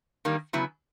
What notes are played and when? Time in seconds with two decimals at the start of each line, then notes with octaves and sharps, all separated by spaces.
0.25 D#3 G3 A#3
0.53 C#3 F#3 B3 E4